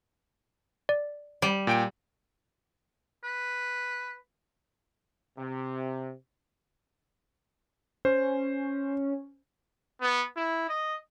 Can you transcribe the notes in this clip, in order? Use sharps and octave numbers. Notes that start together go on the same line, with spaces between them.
D5
G3
A#2 G5 D7
B4
C3
C#4 C5
B3
E4
D#5